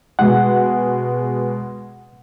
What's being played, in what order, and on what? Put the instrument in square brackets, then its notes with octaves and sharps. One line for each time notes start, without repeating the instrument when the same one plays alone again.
[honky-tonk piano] B2 G#3 [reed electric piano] F#5